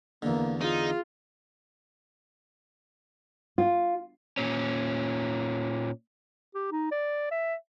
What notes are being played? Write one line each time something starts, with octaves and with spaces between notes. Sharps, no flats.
E2 D3 A#3
D#4 F4 G#4
F4
A#2 C#4
G4
D#4
D5
E5